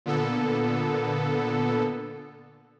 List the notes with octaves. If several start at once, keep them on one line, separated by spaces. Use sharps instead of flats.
A#2 D3 B3 A4